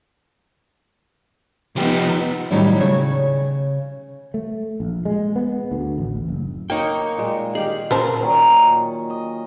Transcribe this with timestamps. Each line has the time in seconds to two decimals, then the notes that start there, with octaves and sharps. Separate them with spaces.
1.77 F3 B3 D#4 G4
2.51 A2 D#3 F#3 G3 C#4 E4
2.80 C#3 C#5
4.34 A3
4.80 A#1
5.06 G#3
5.36 B3
5.71 D2
5.98 A1
6.28 F#1
6.70 A#3 D#4 C#5 G5
7.18 A#2 G#3
7.55 D#3 G4 G#4 F5
7.91 A#2 C#3 F4 A#4 C5 A5
8.22 A#2 D#3 F#3 C#6
9.10 D#5